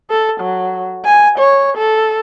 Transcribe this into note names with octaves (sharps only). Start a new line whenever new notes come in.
A4
F#3
G#5
C#5
A4